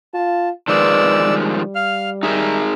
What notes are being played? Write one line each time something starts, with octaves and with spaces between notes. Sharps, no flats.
F4 A5
D#3 F3 G#3 B4 D5 E6
G3
F5 F6
D#4 G#4 A#4 E5